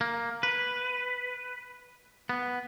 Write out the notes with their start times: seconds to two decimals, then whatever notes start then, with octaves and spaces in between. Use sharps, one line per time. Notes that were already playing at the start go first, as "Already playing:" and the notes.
0.01 A#3
0.43 B4
2.29 B3